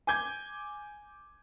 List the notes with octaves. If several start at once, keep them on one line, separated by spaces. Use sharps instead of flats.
G#5 D6 G6 G#6